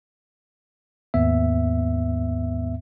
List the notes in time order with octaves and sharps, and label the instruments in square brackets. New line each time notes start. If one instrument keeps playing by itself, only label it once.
[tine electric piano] D#2 G#2 B3 E5